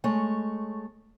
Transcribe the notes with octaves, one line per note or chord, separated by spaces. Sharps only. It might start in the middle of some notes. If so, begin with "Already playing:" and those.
G#3 A3 C#5